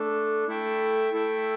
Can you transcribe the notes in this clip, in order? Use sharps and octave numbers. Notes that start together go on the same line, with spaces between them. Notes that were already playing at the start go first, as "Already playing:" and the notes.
Already playing: A3 D4 A4
A3 E4 A4 E5 G5
A3 E4 A4 E5 G5